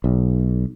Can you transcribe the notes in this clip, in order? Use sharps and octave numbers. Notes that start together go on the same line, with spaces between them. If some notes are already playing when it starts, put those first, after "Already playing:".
B1